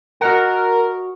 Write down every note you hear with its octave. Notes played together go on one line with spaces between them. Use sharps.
F#4 A#4 D#5 F#5